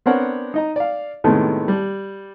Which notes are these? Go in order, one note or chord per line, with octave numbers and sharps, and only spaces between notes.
B3 C4 D4 A#4 C#5 F#5
D#4 D#5 A#5
D5 F5
A2 C3 D#3 G#3 A3 B3
G3